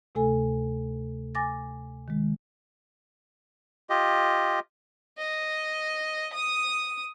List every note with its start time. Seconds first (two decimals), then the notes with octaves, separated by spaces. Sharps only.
0.15 D2 C3 A3 A4 G#5
1.35 G#5 D6 A6 A#6
2.08 D#3 G#3
3.90 F4 G4 D#5
5.18 D#5
6.33 D#6